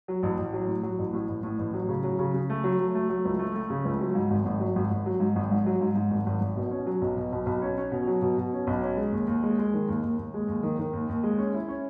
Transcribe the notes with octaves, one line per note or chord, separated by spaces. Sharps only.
F#3
A1
A1
F#3
A2
F#3
A1
A2
A1
A2
A1
F#3
C#3
F#3
C#3
C#3
A3
F#3
F#3
A3
F#3
C#2
A3
A3
C#3
C#2
F#3
G#2
G#1
G#1
F#3
G#1
G#1
F#3
G#2
G#1
G#2
F#3
G#2
G#2
G#1
G#1
G#1
B2
C#4
F#3
B1
B2
B1
B1
C#4
C#4
B2
F#3
B2
B2
C#4
B1
C#4
G#3
D#2
D#2
G#3
G#3
D#3
D#2
D#2
D#2
G#3
D#2
D#3
D#3
D#2
D#2
G#3
C#4
E4
C#4